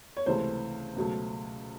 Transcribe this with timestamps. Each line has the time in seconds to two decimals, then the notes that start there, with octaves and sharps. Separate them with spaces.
0.17 C#5
0.26 C#2 C3 E3 A3 C5
0.96 C#2 B2 F#3 A3